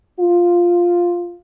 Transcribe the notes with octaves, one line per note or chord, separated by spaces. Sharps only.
F4